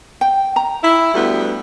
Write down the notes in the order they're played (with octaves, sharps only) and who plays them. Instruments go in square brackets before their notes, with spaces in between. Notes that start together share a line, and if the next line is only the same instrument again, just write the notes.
[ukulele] G5
A#5
[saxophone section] E4
D2 G3 B3